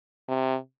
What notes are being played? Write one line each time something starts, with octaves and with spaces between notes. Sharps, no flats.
C3